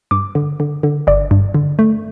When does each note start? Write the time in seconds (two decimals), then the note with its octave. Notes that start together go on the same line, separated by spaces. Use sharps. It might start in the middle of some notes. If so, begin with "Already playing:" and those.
0.11 G2 D6
0.35 D3
0.60 D3
0.83 D3
1.07 G1 D5
1.31 G2
1.55 D3
1.79 A3